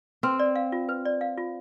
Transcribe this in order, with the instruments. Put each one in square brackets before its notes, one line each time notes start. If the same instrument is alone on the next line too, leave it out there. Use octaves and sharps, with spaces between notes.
[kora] C4 [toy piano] B4
[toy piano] D5
F5
F4
B4
D5
F5
F4